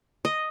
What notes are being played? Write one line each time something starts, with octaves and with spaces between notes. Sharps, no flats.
D#5